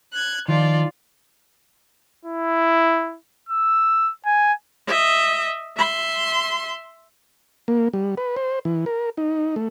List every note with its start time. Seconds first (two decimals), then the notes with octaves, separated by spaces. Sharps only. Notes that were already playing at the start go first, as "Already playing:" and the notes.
0.13 F#6 G#6
0.48 D#3 F3 F4 D5
2.25 E4
3.49 E6
4.26 G#5
4.87 D#5 E5
5.77 E5 C6
7.68 A#3
7.93 G3
8.18 B4
8.36 C5
8.65 E3
8.86 A#4
9.17 D#4
9.56 A3